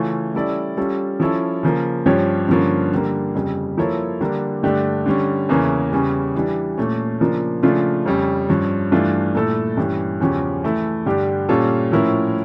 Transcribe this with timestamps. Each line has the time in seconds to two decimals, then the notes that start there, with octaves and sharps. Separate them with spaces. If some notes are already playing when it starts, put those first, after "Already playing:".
Already playing: C#3 E3 A3 C#4 F4
0.34 G3 C#4 E4 A4 D5
0.77 G3 C#4 F4 A4
1.20 F3 C#4 E4 A4
1.63 C#3 F3 A#3
2.06 G2 F3 C#4 G4 C#5
2.49 G2 D3 F3 A#3 C#4
2.92 D3 G3 A#3
3.35 F2 C#3 G3
3.78 F3 A#3 E4 A4 C#5
4.21 D3 G3 A#3 D4
4.63 G2 D3 A3 D4 G4
5.06 D3 G3 C#4
5.49 E2 C#3 E3 A#3 C#4
5.91 E2 C#3 G3 C#4
6.35 E3 G3 D4
6.78 A#2 A3 C#4
7.20 C#3 F3 A#3 D4 F4
7.63 C#3 F3 A3 D4 F4
8.06 F2 C#3 G3 C#4
8.49 G2 F3 C#4
8.92 G2 E3 A3 D4 F4
9.34 A#2 A3 E4 A4
9.77 G2 E3 G3 C#4
10.20 E2 C#3 F3 C#4 G4
10.63 E3 A3 E4
11.06 G2 D3 G3 D4 G4
11.49 A#2 G3 C#4 F4 A4
11.92 A2 F3 C#4 E4 A#4